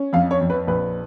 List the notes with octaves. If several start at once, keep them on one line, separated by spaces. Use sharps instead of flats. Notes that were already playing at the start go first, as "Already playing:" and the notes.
Already playing: C#4
F2 F5
C#5
F2
B4
A#1 B4